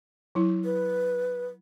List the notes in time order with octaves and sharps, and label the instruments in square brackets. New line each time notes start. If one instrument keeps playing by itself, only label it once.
[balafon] F#3 E4
[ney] B4